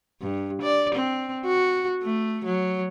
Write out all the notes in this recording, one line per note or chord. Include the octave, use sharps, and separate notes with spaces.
G2
D5
C4
F#4
A3
F#3